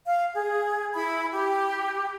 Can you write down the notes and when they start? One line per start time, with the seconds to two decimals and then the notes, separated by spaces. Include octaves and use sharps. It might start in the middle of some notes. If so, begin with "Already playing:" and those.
0.05 F5
0.34 G#4
0.94 E4 B5
1.32 G4